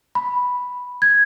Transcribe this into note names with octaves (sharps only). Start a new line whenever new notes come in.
B5
G#6